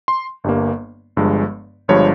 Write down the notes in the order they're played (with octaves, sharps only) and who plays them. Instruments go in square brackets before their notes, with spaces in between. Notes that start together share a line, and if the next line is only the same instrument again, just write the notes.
[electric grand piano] C6
G1 G2 G3 A#3
G1 G2 F3 G#3
G1 G2 F3 G#3 C#5